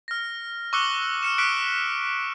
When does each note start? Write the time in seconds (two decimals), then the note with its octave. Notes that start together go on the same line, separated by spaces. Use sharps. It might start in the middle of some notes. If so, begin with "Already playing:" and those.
0.08 F6 A#6
0.73 C#6 D6 E6 F#6 C#7 G7
1.23 F6 C#7 E7
1.38 D6 F6 F#6 B6 C#7 D7